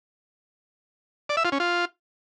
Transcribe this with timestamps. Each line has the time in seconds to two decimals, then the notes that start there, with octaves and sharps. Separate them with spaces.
1.29 D5
1.37 E5
1.45 F4
1.52 C#4
1.60 F4